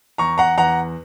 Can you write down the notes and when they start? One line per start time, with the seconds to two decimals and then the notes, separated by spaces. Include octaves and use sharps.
0.18 E2 A#5 C#6
0.38 F#5 A#5
0.58 E2 F#5 A#5